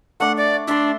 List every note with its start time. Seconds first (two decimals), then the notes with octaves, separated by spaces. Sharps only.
0.20 A3 D4 F#5
0.37 D5
0.67 D4 E5 C6